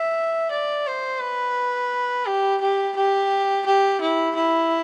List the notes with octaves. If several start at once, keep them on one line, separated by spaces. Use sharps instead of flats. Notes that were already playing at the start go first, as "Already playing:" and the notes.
Already playing: E5
D5
C5
B4
G4
G4
G4
G4
E4
E4